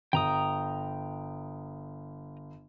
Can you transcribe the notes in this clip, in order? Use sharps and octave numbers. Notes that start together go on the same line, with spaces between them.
G1 G5 A#5 D#6